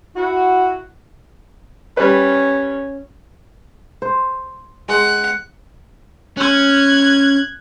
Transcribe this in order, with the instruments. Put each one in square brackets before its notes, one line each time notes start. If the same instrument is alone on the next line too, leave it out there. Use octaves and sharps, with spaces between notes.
[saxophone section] E4 F#4
[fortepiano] G3 B4 [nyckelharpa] C#4
[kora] C5
[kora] G#3 [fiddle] F#5
[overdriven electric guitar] C#4 [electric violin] F#6 G#6